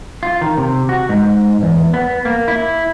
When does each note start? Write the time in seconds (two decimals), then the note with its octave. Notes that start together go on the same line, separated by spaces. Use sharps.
0.23 F4
0.41 D#3
0.58 C3
0.89 F#4
1.09 G#2
1.63 E2
1.94 B3
2.25 A#3
2.48 E4